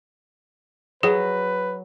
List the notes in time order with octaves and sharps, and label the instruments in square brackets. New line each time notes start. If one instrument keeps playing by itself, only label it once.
[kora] F#3 [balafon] G#4 [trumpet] B4